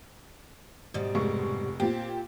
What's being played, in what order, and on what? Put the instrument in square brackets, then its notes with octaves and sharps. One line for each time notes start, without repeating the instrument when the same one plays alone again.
[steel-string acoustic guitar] G#2 B2 G3
[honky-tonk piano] F1 G#3 C#6
[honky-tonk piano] A#2 G4 [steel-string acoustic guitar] C4